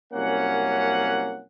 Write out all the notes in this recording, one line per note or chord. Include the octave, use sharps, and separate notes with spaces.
C2 F#2 A#3 C#4 F#5